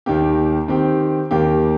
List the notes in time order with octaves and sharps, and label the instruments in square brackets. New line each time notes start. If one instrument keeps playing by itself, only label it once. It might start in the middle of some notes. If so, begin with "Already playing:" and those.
[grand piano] D#2 D#3 A#3 G4
D#3 C4 G4
D#2 D#3 A#3 G4